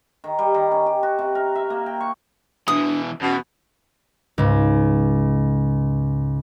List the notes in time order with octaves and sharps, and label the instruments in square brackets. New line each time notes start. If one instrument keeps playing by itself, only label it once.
[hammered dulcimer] D#3
G3
D#3
C#4
G4
F#4
C3
A#4
E5
A#3
G5
C#6
[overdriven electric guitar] B2 E3 [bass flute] D4 [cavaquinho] D#6
[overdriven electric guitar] E2 [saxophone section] B2 [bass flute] C#4
[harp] C#2 G#2